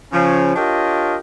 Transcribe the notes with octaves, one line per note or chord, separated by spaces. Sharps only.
C#3 F3 C#4
D4 F4 G4 A#4 C#5 D#5